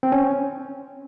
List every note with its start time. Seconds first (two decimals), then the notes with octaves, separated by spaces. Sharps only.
0.03 C4
0.12 C#4